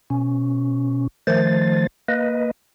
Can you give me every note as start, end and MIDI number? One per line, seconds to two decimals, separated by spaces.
0.10 1.07 47
0.10 1.07 61
1.27 1.87 51
1.27 1.87 53
1.27 1.87 57
1.27 1.87 72
1.27 1.87 93
2.08 2.51 58
2.08 2.51 71
2.08 2.51 75